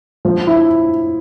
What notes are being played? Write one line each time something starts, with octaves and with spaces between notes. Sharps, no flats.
F3
E4